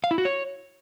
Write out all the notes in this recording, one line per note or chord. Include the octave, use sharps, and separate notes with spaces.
F5
E4
F#4
C#5